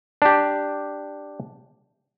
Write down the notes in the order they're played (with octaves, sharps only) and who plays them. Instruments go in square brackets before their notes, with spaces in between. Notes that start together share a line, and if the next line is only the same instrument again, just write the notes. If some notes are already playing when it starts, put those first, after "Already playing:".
[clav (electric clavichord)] D4 G4